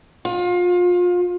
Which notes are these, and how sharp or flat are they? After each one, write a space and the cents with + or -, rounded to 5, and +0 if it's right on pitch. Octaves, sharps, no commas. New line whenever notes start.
F4 +30